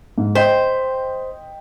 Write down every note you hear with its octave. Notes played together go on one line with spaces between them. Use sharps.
G#2
C5 D#5 G5 B6